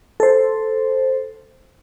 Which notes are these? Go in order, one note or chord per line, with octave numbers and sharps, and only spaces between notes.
A4 C5